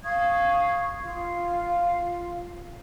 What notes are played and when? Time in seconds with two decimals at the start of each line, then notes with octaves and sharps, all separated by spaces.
0.04 F5 C#6 D#6 G#6
1.02 F4 F5